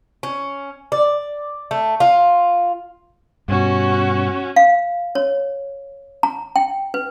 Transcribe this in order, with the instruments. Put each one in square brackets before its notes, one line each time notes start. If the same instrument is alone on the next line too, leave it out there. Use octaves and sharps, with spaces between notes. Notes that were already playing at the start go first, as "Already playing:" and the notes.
[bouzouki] C#4
D5
A3
F4
[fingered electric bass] G2 B2 [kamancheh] C#4 F#4
[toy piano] F5
C#5
A#5
G5
B4